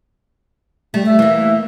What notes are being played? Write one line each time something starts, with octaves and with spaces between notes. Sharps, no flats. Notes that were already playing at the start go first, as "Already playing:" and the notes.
G3 A3
E5
E3 A#3